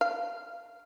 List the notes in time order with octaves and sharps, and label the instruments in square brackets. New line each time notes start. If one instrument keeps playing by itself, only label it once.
[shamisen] F5